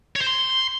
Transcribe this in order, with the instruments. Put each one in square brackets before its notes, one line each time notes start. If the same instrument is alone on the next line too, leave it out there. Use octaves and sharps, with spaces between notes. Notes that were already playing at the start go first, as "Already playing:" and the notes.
[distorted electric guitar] C#5
C5
C6